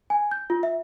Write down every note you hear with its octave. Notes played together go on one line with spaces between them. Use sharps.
G#5
G6
F4
E5